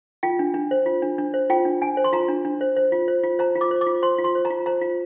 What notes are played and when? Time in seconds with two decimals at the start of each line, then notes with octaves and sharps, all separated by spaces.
0.23 F4 G5
0.39 D4
0.54 D4
0.71 C5
0.86 F4
1.02 D4
1.18 D4
1.34 C5
1.50 F4 G5
1.65 D4
1.82 D4 G#5
1.97 C5
2.04 C6
2.13 F4 A#5
2.29 D4
2.45 D4
2.61 C5
2.77 C5
2.92 F4
3.08 C5
3.24 F4
3.39 C5 A#5
3.55 F4
3.61 D6
3.71 C5
3.81 D6
3.87 F4
4.02 C5 C6
4.19 F4
4.24 C6
4.35 C5
4.45 A#5
4.50 F4
4.66 C5 A#5
4.82 F4